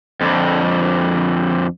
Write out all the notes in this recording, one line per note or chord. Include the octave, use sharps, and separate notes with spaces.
F2 D3